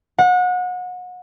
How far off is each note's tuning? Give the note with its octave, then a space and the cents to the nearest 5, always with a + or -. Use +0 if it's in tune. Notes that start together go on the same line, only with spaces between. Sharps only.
F#5 -30